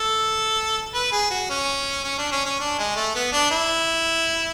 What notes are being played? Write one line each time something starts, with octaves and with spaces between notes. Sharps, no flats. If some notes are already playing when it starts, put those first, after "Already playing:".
Already playing: A4
B4
G#4
F#4
C#4
C#4
D4
C#4
C#4
D4
G#3
A3
B3
D4
E4